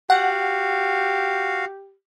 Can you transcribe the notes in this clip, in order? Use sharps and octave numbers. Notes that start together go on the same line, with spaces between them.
F#4 G4 F5 F#5